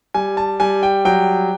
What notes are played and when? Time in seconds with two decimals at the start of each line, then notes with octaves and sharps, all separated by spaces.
0.14 G3 G#5
0.37 A5
0.60 G3 G#5
0.83 G5
1.05 F#3 G5